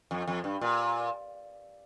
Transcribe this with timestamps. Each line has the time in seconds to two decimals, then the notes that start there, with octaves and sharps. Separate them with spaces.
0.11 F2
0.28 F2
0.44 G2
0.61 A#2